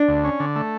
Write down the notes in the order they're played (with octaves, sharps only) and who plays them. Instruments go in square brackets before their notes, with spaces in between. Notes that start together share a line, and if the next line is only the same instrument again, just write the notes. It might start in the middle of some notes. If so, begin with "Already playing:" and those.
Already playing: [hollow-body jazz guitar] D4
[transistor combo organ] D2
C#4
D3
A3